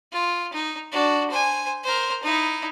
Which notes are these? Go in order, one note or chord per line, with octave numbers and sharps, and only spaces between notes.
F4
D#4
D4 F#4
C5 G#5
A#4 C5
D#4 E4